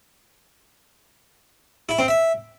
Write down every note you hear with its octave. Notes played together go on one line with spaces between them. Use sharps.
E4
C4
E5